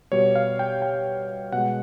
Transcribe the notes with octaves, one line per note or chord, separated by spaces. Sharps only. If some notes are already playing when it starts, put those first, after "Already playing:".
B2 G3 C#5
F5
G5
G5
B2 G#3 F#5